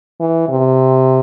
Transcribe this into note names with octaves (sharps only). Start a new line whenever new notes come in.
E3
C3